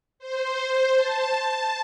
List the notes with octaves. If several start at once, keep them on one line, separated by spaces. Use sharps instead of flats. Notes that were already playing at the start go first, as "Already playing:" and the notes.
C5
A5
A5